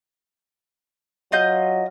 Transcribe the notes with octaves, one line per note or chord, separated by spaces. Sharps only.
F#3 F4 D#5 G6